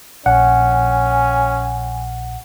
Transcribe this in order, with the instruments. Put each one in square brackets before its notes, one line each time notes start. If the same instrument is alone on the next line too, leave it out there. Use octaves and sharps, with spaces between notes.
[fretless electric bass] A#1 [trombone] C#4 [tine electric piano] F#5 [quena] G#5